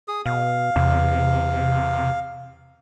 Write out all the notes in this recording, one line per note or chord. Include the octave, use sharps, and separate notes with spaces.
G#4 D#6
B2 F5
E2 C3